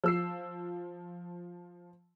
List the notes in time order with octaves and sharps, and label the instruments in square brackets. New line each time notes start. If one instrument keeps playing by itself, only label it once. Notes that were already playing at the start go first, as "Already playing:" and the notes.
[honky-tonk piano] F3 E6 C7